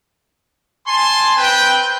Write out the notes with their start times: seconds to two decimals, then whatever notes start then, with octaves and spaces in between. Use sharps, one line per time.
0.87 G#5 A5 C6
1.36 C4 B4 G5